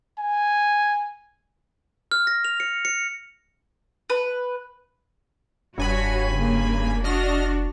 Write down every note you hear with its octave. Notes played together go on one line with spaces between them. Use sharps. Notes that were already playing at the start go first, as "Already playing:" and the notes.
G#5
F6
A#6
F7
C#7
C#7
B4
F1 G2 F#4 C#5 G#5 B5
C#3 A#3
D4 F#4 D#5 F6 A#6